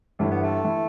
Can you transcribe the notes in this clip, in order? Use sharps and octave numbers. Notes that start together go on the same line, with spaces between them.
G1 G2 E3 A3
B3
A3
E3